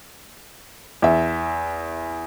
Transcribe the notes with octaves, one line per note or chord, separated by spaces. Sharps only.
E2 E5